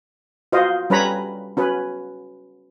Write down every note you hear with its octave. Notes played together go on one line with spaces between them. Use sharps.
F4 F#4 C5 D#5 F5
G3 C#4 B4 C#5 A#5 B5
C#4 F#4 B4